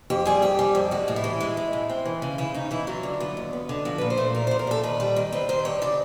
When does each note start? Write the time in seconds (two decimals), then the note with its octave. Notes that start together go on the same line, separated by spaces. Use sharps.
0.10 F2 G4
0.25 G3 G#4
0.42 F2 G4
0.59 G3
0.75 F2
0.91 G#3 F#4
1.08 A2
1.16 E4
1.24 E3
1.40 G#3
1.57 G#3
1.73 A2
1.89 C4
2.06 E3
2.22 C#3
2.38 C#3 E4
2.54 C#3 D#4
2.71 E3 E4
2.87 F#3 F4
3.03 D3
3.20 B3
3.37 D#2
3.53 B3
3.69 D3
3.85 F3 F#4
3.98 A#2 B4
4.10 C5
4.17 A3
4.35 F3 A#4
4.47 C5
4.51 A#2
4.59 A#4
4.67 A#2 A4
4.83 D#3 B4
5.00 G3
5.16 D#3
5.32 C4 B4
5.49 D#3 C5
5.65 G2 C#5
5.82 C#3 D5